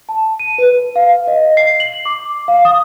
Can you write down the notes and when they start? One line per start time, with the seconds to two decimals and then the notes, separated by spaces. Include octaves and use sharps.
0.09 A5
0.39 D#7
0.58 B4
0.96 F5
1.28 D#5
1.57 C7
1.80 F#7
2.05 D6
2.48 F5
2.65 D#6